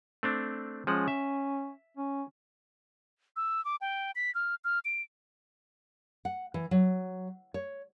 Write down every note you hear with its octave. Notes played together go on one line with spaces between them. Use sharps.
A3 C4 D4
F3 G#3 C#4 F#5
E5
C#4
E6
D6
G5
B6
F6
F6
D7
F#5
E3
F#3
C#5